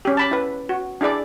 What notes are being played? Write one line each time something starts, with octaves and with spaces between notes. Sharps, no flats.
C#4 G4
A5 B5 D6
E4 B4
F#4
D4 E4 G#4 D5 D6